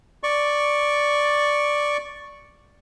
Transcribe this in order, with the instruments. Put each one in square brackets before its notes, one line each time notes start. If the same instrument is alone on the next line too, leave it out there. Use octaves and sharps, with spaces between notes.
[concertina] D5 C#6